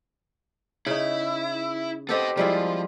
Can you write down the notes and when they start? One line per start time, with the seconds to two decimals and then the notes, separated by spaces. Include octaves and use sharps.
0.86 C#3 D#4 E4
2.09 B3 C4 G4 A4 D#5
2.37 F3 G3 G#3 E4